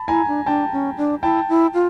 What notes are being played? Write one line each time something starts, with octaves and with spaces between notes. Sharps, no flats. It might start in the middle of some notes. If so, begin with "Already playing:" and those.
Already playing: A5 B5
E4 G#5 A#5
D4
D4 G5 A5
C#4
D4
E4 G5 A5
E4
F4